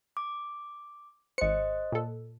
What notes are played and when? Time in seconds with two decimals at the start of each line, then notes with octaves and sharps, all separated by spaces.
0.17 D6
1.38 G#1 C5 D#5 C#7
1.92 A#2 A4